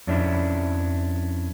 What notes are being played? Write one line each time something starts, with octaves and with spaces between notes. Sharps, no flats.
F2 C#4 D4 E4